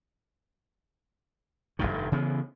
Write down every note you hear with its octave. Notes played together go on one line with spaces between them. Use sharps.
F1 C2 G2 D#3
C#3 E3 B3